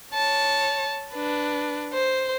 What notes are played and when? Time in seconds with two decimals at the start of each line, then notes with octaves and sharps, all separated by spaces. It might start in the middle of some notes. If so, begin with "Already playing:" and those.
0.13 C#5 A5
1.12 D4 B4
1.93 C5